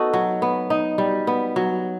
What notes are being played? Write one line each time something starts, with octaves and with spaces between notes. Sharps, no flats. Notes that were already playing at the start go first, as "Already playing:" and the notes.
Already playing: B3 D#4 F#4 A4
F#3
B3
D#4
G3
B3
F#3